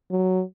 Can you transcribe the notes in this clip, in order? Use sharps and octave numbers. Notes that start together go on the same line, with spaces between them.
F#3